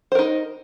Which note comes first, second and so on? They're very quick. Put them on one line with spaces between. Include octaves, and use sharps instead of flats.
C5 A#4 D#4